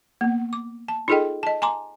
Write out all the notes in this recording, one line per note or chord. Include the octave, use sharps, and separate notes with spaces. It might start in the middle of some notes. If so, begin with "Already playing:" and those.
A#3 B3
D6
A5
D#4 F4 G#4 A4 D#5 G5
D#5 A5
G#5 A#5 C6 D6